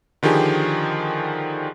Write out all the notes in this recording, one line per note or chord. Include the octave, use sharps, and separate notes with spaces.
D3 D#3 F3 G4 G#4